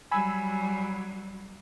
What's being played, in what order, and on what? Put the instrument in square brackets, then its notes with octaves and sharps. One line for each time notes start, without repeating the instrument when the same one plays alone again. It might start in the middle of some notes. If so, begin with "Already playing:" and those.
[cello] F#3 G3 [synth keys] G#5 B5 E6